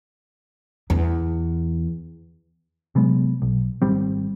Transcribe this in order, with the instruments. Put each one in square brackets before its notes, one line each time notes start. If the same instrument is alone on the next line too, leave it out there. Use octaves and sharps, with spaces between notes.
[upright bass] E2
[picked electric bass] C3 F#3 G#3 B3
B1
G#1 G3 C4